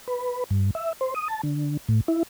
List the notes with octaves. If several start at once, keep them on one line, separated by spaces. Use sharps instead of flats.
B4
G2
E5
C5
D#6
A5
D3
A2
E4